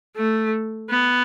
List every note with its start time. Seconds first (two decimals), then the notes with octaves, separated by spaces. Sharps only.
0.16 A3
0.90 B3